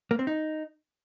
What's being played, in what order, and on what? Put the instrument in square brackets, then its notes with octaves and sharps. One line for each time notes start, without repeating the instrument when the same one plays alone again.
[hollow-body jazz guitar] A#3
C4
D#4